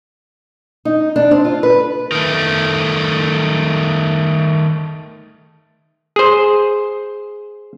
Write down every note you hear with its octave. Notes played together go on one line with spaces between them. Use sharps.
D#4
D4
C4
F4
B4
D#3 A3
G#4 C5